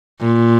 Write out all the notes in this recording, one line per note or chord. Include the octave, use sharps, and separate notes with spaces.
A#2